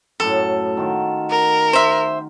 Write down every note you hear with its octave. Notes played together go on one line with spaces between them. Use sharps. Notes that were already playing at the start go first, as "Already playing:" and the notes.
F#2 A2 A4
D#3 F4 F#4
A#4
C5 E5